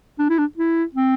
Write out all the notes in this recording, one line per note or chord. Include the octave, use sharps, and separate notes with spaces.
D4
E4
D4
E4
C4